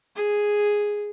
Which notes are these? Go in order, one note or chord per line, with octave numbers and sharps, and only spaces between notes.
G#4